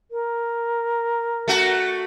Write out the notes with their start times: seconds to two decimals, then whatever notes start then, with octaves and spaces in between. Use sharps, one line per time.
0.11 A#4
1.48 A3 F#4